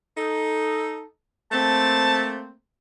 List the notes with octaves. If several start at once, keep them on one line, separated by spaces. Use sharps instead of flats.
D#4 A4
A3 A#3 C4 A5